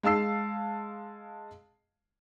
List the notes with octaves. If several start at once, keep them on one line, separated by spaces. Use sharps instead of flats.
G#3 F5 A5 E6 C7